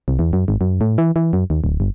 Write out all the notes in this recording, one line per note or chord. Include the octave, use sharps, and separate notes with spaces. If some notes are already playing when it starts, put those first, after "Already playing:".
C2
E2
F#2
G#1
F#2
A2
E3
E3
F#2
D#2
D1
G1